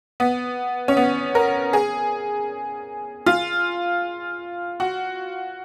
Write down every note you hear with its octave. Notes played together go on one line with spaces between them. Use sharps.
B3
C#4
B3
A#4
G#4
F4
F#4